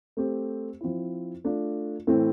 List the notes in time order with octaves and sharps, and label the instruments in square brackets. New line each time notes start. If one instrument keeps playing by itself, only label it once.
[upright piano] A3 C4 G4
F3 C4 E4
A3 D4 F4
A2 E3 A3 C4 E4